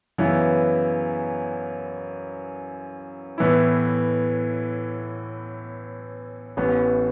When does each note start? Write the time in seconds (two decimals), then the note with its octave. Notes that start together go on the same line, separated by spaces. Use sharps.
0.18 F#2 C#3 E3 B3 E4
3.38 A2 E3 B3 E4
6.57 A1 A2 E3 B3